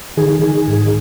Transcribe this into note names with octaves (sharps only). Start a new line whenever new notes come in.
D#3 G#4
D#3
G#2